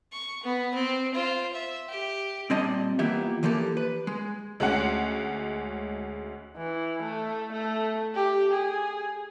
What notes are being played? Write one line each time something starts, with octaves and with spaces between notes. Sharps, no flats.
C#6
B3
C4
F4 C5
E5
G4
A#2 G3 C4 D5 D#5 A5
E3 A#3 B3 F4 G4 E5
E3 F3 A#3 G4 A4
B4
G#3
D2 G#3 C#4 F#5
E3
A3
A3
G4
G#4